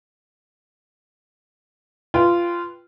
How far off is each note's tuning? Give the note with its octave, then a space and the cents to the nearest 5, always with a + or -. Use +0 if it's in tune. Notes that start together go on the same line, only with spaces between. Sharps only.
F4 -15 B4 +0 G5 +0